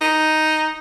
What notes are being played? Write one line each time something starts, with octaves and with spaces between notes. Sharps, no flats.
D#4